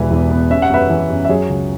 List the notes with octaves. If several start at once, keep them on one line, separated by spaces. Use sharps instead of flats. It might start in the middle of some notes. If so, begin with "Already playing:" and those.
Already playing: E1 E3 B4
E2
B3
C#4 E5
F#5
F#2 B4 E5
E3
F#2
E5
F#3 G#4 C#5
C#2